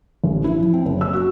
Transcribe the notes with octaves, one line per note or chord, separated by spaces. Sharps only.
A1
E4
F3
C4
F#1
E6
F#4